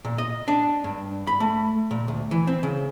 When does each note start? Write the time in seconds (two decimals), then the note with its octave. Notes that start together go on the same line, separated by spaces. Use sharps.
0.05 A#2
0.18 D#5
0.48 D4
0.84 G2
1.27 B5
1.40 A3
1.91 A#2
2.08 D2
2.31 E3
2.47 C4
2.63 C#3